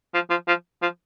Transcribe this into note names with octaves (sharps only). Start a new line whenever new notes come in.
F3
F3
F3
F3